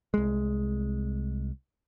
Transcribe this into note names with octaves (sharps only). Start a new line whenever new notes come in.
C2 G#3